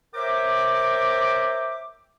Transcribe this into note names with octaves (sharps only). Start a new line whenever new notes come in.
A#4 C5 C#5 E5 G5 D6